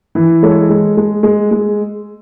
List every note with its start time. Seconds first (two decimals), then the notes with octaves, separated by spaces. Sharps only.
0.15 E3
0.42 G#3 A4 C#5
0.69 G#3
0.97 G#3
1.23 G#3
1.51 G#3